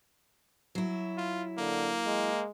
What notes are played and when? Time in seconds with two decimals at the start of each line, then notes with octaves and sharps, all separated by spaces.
0.75 F#3 E4
1.18 F4
1.58 D3 A#3
2.06 G#3